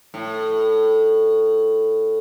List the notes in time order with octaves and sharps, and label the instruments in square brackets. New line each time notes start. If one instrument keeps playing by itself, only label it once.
[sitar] A2